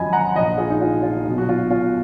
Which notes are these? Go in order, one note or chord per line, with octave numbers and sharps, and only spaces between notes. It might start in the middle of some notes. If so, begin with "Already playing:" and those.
Already playing: G#1 F#2 F3 D#5 G#5 B5
F#5 A#5
A#1 A#2 F3 D#5 F#5
F4 G#4
D#4
F4
F4
B1 B2
F#4
F4
F4